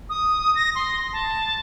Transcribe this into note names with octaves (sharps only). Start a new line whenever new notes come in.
D#6
A#6
C6
A5